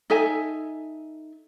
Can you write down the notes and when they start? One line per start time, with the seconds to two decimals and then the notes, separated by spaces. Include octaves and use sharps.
0.10 D#4 A4 E5 G#5